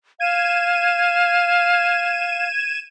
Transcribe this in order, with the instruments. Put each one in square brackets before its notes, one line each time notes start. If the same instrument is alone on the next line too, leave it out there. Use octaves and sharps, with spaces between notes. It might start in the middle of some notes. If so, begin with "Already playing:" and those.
[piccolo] F5 [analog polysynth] G#6 D#7 E7